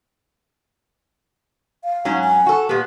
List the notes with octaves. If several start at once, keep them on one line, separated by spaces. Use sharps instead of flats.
F5
G#2 F#3 C#4
G#5
F#4 A4
A#2 B3 G4